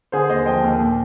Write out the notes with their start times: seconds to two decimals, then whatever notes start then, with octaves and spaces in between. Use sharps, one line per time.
0.12 D3 G#4 C5
0.30 D#2 C5 D#5
0.46 F3 D#5 G5
0.64 D#2
0.80 A#2